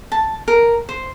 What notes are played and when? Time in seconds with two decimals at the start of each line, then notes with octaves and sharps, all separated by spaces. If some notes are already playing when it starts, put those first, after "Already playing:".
0.12 A5
0.48 A#4
0.89 C5